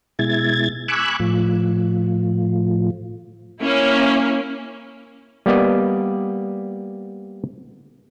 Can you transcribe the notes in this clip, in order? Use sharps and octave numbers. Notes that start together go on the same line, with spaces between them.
B2 G#3 E4 G#6 A6
G#5 B5 C#6 D6 E6 F#6
A2 F3
A#3 C#4 E4
G3 A#3 B3 D5 D#5